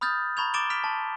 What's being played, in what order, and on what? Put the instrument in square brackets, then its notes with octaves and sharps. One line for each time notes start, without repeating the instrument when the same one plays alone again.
[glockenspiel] B5 D#6 F6 G6 A6
A#5 B5 C#6 G#6 F7
D6 A6 D7 E7 G7
F6 B6 D7 F7 G7
A5 C6